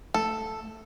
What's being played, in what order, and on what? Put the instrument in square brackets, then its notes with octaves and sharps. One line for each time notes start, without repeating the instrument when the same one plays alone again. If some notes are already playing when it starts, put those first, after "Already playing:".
[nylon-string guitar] A3 [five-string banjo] A4